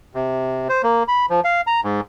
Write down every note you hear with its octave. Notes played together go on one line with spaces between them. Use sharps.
C3
C5
A#3
B5
F3
F5
A#5
G#2